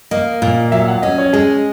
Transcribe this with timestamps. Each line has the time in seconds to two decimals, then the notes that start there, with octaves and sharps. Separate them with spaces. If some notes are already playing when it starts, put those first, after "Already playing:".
0.11 A#3 D#5
0.42 A#2
0.72 F#3 E5
0.88 F#5
1.02 C#4 D#5
1.18 C#5
1.33 G#3 G#4